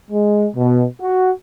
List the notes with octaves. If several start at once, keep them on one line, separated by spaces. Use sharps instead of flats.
G#3
B2
F#4